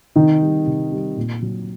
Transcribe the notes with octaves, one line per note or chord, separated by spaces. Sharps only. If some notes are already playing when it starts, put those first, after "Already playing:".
C3 D#3 D#4
G3
C3
G3
A#2
F#3